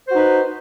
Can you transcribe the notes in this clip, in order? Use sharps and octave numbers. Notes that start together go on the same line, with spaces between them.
D#4 F#4 B4 C5